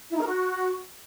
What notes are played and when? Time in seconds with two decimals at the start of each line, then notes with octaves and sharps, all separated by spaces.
0.11 E4
0.16 D#4
0.21 A#4
0.26 F#4